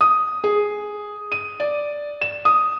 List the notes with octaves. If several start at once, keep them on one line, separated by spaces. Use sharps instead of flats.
D#6
G#4
D#7
D5
E7
D#6